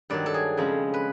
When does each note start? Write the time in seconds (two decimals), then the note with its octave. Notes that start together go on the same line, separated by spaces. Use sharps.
0.10 G2 D#3 F#3 D5
0.26 A4
0.34 G#4
0.57 F2 C#3 F3 G#3
0.94 B4